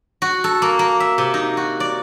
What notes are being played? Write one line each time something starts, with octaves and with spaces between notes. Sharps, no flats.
F#4
A4
A#3
A#3
E5
C3
D#4
F#4
D5